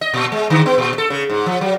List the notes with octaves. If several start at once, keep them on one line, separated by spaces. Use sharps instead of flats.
D#5
A#2
G#3
D3
B3
A#2
A4
C#3
G#2
F3
F#3